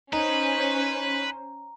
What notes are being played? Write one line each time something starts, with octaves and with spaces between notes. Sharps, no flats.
C#4 D#4 B4 C5 A#5